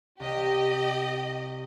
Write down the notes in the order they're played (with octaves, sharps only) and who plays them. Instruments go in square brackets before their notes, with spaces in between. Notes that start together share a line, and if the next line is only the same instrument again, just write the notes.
[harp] C2 [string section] G4 D#5